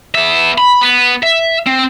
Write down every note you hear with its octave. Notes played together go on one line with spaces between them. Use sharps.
B3 E5
B5
B3
E5
C4